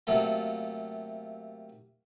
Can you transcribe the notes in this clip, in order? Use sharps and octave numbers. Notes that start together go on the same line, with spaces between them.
C3 F#3 A3 A#3 F4